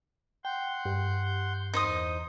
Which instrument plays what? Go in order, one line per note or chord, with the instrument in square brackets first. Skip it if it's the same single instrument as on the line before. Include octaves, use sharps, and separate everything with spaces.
[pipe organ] F#5 C6 G6 [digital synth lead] G5
[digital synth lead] G2
[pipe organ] E2 [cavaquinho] D#4 C5 D#6